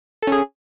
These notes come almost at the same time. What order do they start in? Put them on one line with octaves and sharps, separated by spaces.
A4 C#4 G#4